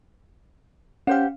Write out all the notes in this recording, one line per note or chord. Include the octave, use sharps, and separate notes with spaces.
C#4 G4 C5 F5 F#5